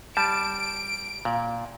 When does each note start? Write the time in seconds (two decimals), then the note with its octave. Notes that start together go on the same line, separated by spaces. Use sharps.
0.17 G3 A5 D7
1.25 A#2